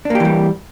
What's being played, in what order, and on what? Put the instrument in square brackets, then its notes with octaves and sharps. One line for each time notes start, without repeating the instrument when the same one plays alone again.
[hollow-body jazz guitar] D4
A#3
G4
E3
G3